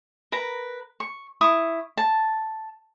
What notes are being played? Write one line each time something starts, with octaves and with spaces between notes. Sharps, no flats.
A#4 B4 A#5
C#6
E4 C#6 D#6
A5